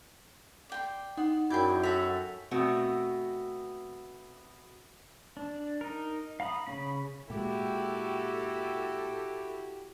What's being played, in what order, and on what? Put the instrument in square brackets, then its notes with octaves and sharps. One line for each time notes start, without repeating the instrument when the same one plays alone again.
[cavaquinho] D5 G5 C6
[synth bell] D#4 F#5 [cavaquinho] C6
[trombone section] F#2 [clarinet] E4 [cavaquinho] G#4 D5 [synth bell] G5 G6 G#6
[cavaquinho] F#4 B5 [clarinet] A4 [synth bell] B6 F7
[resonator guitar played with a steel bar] B2 A3 B3 C4 F#4
[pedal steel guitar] D4
D#4 A#4
F5 A#5 B5 D#6
C#3 C#4 B5
[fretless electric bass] A#2 G#3 [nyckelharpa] E4 F#4 [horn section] G4 [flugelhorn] A4